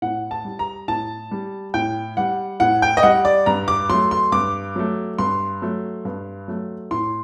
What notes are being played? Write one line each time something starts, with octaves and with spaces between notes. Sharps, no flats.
A2 F#5
A5
G3
A#5
A2 A5
G3
A2 G5
G3 F#5
A2 F#5
G5
D#5
G3 F#5
D5
G2 A#5
D6
F#3 A3 C6
C6
G2 D6
F#3 A3
G2 C6
F#3 A3
G2
F#3 A3
A2 C6